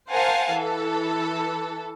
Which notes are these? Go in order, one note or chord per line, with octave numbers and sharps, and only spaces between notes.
A#4 C5 F5 F#5 G#5 A5
E3 A4